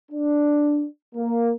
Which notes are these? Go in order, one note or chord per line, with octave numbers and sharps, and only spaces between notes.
D4
A#3